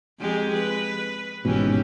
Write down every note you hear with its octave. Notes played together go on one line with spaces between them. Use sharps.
F2 G#3 G4
B4
G#1 G#2 B2 E3 C#4 G4